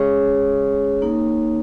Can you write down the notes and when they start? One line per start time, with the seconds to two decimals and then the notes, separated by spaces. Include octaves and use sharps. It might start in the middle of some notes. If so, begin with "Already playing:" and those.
Already playing: G#3 C#4 G#4 C#5
1.02 A#3 D#4 A#4 C#5